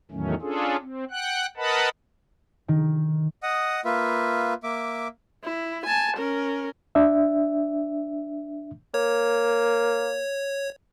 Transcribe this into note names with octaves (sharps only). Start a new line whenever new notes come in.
E2 A2 D#3 F#3 A3 C#4
C#4 D4 F4 G#4 A4
C4
F#5 G5 F#6
A#4 B4 D#5 F#5 A5 B5
D#3
D#5 F#5 D#6
A#3 F4 B4 E5
A#3 E5 D6
E4
G#5 A5
C#4 A#4
D4 E5
A#3 C#5